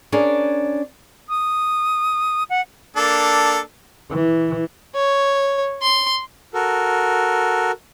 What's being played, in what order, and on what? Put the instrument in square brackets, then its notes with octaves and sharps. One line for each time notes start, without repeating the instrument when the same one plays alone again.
[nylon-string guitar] C#4 D4 G#4 A#4
[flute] D#6
F#5
[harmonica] A#3 D4 A4
[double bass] E3
[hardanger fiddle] C#5
C6
[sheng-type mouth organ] F#4 A4 A#4